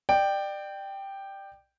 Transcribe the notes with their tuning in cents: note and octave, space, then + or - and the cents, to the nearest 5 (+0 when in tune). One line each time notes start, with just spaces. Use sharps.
D5 +30 G5 +0